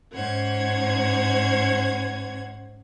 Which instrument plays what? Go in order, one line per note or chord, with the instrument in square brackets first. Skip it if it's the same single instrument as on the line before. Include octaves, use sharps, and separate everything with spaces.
[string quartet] G#2 C#4 C5 C#5 F#5 G#6